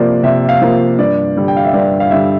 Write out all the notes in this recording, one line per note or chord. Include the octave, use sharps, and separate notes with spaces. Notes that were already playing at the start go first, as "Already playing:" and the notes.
Already playing: C3 F3 A#3 D5
C3 E5
F5
F3 A#3
G2 D5
D3 G3
G5
F5
E5
G2 D5
F5
D3 G3 E5